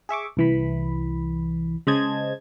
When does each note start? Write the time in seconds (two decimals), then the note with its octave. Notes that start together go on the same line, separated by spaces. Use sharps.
0.09 G#4 E5 C#6 D6
0.37 C2 E3 B5
1.87 C#3 G#3 C5 D#5 A5 G#6